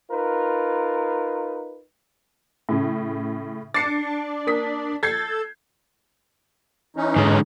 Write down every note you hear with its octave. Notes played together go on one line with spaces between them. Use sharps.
D#4 F4 A#4 B4
A2 C#3
D4 A6 C7 C#7
A#3 D#6 B6
A4 G6 G#6 C7
E3 C#4 D#4
G#2 D3 G#3